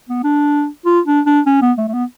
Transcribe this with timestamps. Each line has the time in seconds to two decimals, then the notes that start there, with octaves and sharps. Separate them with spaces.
0.09 B3
0.24 D4
0.85 F4
1.06 D4
1.26 D4
1.46 C#4
1.62 B3
1.78 A3
1.88 A3
1.94 B3